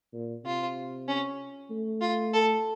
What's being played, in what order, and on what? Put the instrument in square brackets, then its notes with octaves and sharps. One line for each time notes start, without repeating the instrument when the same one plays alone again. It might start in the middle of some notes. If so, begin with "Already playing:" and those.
[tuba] A#2
[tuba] C3 [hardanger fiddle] F4
[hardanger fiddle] C#4
[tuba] A3
[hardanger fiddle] F4
A4